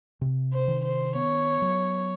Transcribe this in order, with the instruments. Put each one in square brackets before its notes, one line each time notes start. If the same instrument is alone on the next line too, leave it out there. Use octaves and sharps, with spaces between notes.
[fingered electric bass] C3
[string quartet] C5
[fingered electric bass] D#3
[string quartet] C5
[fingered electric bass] B3 [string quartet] C#5
[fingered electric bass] F#3